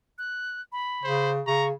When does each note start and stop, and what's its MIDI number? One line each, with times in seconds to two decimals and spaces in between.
0.18 0.61 90
0.72 1.29 83
1.03 1.40 49
1.03 1.32 72
1.47 1.72 49
1.47 1.67 82
1.47 1.68 85